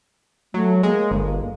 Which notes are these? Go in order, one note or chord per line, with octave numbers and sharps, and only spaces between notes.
F#3 A3
G#3 A#3
G1